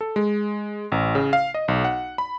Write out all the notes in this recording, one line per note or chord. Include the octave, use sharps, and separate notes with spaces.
A4
G#3
A1
C#3
F5
D#5
B1
F#5
B5